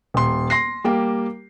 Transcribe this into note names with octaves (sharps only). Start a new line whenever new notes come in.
D#1 C6
C6 A#6 C7
G3 A#3 G4